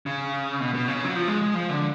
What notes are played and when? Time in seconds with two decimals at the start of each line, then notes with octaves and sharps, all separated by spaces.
0.06 C#3
0.60 B2
0.74 B2
0.88 C#3
1.04 F#3
1.15 F3
1.28 G#3
1.42 G#3
1.55 F3
1.69 D3